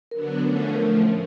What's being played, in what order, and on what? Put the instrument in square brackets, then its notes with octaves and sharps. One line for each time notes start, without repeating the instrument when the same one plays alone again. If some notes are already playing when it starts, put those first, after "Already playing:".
[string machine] D3 F#3 B3 D4 [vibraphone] A#4
[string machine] D3 F3 A3 C#4
[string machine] A2 F3 A3 [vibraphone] A#4